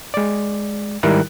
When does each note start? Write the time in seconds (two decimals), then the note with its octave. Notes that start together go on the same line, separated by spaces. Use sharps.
0.14 G#3 D5
1.03 G#2 D#3 G3 E4 A#4 F#6